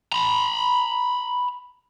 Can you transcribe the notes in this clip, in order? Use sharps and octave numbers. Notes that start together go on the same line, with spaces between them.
A#5 B5